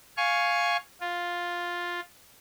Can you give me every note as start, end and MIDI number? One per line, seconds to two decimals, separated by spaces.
0.17 0.77 77
0.17 0.77 80
0.17 0.77 85
1.00 2.00 65